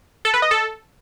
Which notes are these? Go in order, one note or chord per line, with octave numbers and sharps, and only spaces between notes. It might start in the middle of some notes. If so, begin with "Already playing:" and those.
A4
B4
D#5
A4